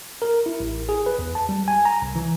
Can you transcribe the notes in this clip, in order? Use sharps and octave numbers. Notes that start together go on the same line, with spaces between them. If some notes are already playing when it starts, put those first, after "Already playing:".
A#4
E4
A1
G#4
B4
E2
A5
G3
G#5
A#5
C2
E3